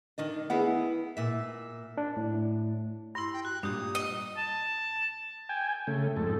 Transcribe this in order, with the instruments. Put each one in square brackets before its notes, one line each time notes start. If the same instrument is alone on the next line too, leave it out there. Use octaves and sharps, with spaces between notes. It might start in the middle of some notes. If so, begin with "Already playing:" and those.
[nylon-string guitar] D#3 D4 D#5
[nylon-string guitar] B3 E4 [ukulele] G#4 B4 F#5
[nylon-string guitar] A#2 E5
[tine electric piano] D4
A2
[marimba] G2 E4 [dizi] C6
[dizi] G5
[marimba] F#4 [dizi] F#6
[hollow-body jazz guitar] G2 A#2 [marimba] D4 G4 [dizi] D#6
[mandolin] D#5
[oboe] A5
[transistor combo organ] G5 G#5
C#3 A3
F2 G#2 A4